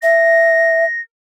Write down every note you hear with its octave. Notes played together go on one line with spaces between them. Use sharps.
E5 A#6